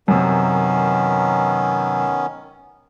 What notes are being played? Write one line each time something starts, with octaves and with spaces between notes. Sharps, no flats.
F#2 C3 D#3 B3 C#4